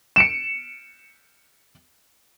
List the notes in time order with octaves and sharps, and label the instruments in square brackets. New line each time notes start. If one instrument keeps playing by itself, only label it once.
[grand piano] C#7 D7 E7